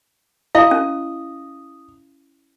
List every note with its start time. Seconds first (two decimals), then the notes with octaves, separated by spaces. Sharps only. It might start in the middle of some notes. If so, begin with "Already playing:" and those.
0.55 E4 D#5 F5
0.71 C#4